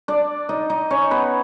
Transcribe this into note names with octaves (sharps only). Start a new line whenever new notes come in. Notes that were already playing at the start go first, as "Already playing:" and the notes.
D4 D5
D#4 D#5
D#4 D#5
C#4 C#5
B3 B4